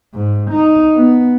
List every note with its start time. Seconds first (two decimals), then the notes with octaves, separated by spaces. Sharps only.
0.14 G#2
0.51 D#4
0.95 B3